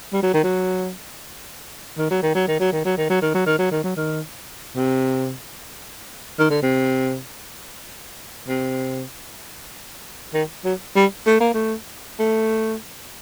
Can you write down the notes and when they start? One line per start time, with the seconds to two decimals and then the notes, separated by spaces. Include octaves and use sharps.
0.13 G3
0.23 F#3
0.34 D#3
0.44 F#3
1.98 D#3
2.11 F#3
2.23 D#3
2.35 F#3
2.48 D#3
2.60 F#3
2.72 D#3
2.85 F#3
2.98 D#3
3.10 F#3
3.22 D#3
3.35 F#3
3.47 D#3
3.59 F#3
3.71 D#3
3.84 F#3
3.97 D#3
4.76 C3
6.39 D#3
6.50 D3
6.62 C3
8.48 C3
10.34 D#3
10.65 F#3
10.96 G3
11.27 A3
11.40 A#3
11.54 A3
12.19 A3